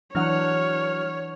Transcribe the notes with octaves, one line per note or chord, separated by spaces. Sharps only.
E3 F#3 D4 C#5 F#5 F6